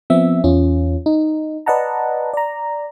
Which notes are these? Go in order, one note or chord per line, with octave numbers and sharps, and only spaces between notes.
F3 B3 C4 E5
E2 C#4 F4
D#4
B4 D5 D#5 F#5 A5 A#5
D5 A#5